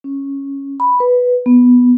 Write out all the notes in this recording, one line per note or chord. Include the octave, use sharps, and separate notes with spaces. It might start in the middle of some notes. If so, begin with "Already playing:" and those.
C#4
B5
B4
B3